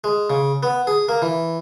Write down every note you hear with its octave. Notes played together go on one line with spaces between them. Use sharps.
G#3
C#3
B3
G#4
A#3
E3